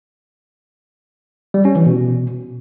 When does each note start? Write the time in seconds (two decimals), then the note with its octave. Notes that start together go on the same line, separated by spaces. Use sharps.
1.54 G3
1.65 C#4
1.76 E3
1.86 B2